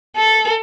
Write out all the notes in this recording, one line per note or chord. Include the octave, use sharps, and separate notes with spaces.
A4